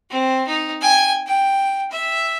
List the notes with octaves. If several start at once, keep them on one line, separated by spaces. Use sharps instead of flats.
C4
D#4
G5 G#5
G5
E5